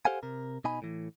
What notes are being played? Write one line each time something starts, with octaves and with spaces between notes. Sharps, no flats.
G4 A4 C5 F5 F#5 G#5
C3 A#4
B2 D#4 G#5 B5
A2 E3